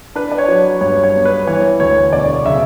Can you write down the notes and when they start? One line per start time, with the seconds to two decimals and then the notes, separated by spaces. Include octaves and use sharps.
0.16 D4 B4
0.32 D5
0.38 C#5
0.48 F#3
0.81 G2 C#5
1.03 C#5
1.15 B3
1.25 B4
1.47 E3 C#5
1.80 D2 C#5
2.12 E1 D5
2.45 C#3 E5